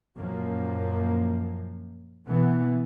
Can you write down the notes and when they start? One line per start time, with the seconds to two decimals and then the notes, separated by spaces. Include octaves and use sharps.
0.16 F#2 A#2 F3 A#3
2.26 B2 E3 B3